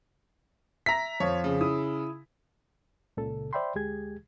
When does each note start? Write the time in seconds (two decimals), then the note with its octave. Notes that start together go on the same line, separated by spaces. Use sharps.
0.86 E5 A#5 A#6 B6
1.20 F2 F3 C#5
1.44 C#3
1.61 E4 D#6
3.17 C#2 A#2 C#3 A4
3.53 C5 D5 E5 G5 B5 C6
3.75 D2 G#3 G4 G#4 G#6